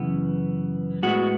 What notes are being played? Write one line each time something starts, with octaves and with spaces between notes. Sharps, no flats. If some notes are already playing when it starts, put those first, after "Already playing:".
Already playing: F#2 C#3 E3 B3
A2 G#3 B3 F#4